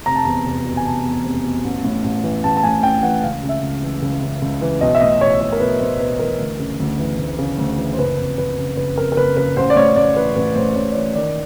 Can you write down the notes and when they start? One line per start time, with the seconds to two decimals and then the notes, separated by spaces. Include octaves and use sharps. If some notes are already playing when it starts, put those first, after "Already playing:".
0.06 F1 A#5
0.16 A5
0.24 E2 A#5
0.46 F1
0.65 B2
0.77 G#5
0.85 F1 A5
1.05 E2
1.24 F1
1.45 B2
1.64 A1
1.84 A2
2.04 A1
2.24 E3
2.44 A1 A5
2.57 A5
2.63 A2 G#5
2.83 A1 G5
3.03 E3 F#5
3.23 C#2 F5
3.43 C#3
3.49 E5
3.62 C#2
3.82 E3
4.02 C#2
4.22 C#3
4.42 C#2
4.62 E3
4.81 B1 D#5
4.95 E5
5.01 A2 D#5
5.21 B1 C#5
5.41 E3 C#5
5.52 A#4
5.60 B1 B4
5.80 A2 C5
6.00 B1 B4
6.19 E3 A#4
6.39 D2
6.59 C#3
6.80 D2
6.99 E3
7.19 D2
7.39 C#3
7.58 D2
7.78 E3
7.93 C5
7.98 F#1 B4
8.18 F2
8.38 F#1 B4
8.58 C#3
8.77 F#1 B4
8.97 F2 A#4
9.12 A#4
9.17 F#1 B4
9.37 C#3 B4
9.56 A1 C5
9.70 D5
9.76 A2 C#5
9.96 A1 D5
10.16 E3 B4
10.36 A1 B4
10.56 A2 C5
10.69 C5
10.75 A1 C#5
10.91 D5
10.95 E3 C#5
11.15 D#3 D5